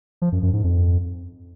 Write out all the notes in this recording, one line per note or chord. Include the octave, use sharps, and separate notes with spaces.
F3
F#2
F#2
G#2
F2